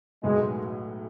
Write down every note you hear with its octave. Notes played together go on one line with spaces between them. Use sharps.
B1 A2 F#3 G#3 B3